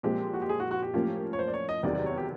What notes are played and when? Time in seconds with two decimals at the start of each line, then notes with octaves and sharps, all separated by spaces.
0.03 A#2 F3 G#3 C4 G4
0.34 F#4
0.42 G4
0.49 G#4
0.60 F#4
0.71 F#4
0.83 G4
0.94 A2 F3 A#3 C#4 F4
1.33 C#5
1.39 C5
1.47 D5
1.54 C#5
1.69 D#5
1.83 E2 C3 D#3 F#3 D5
1.95 D5
2.06 C#5
2.17 G4